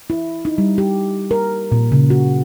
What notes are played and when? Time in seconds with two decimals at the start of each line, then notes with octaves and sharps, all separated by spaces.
0.10 E4
0.45 D#4
0.58 G3
0.78 G4
1.31 A#4
1.72 A#2
1.92 C#3
2.10 F#4